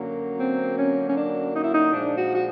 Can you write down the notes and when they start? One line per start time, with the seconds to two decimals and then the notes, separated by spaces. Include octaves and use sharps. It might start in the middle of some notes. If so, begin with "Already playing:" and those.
Already playing: F#2 D3 F#3 A#3
0.39 C4
0.78 C#4
1.09 C#4
1.15 D4
1.55 D#4
1.63 E4
1.73 D#4
1.92 A#2 F3 G#3 D4
2.18 F#4
2.34 F#4